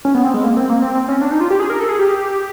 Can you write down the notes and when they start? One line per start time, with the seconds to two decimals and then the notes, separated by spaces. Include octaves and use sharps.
0.05 C#4
0.15 B3
0.24 C4
0.34 G#3
0.44 A#3
0.57 C4
0.70 A#3
0.82 C4
0.95 C4
1.08 C#4
1.22 D4
1.31 D#4
1.41 F4
1.50 G4
1.60 G#4
1.70 A#4
1.79 A4
1.89 G#4
1.99 G4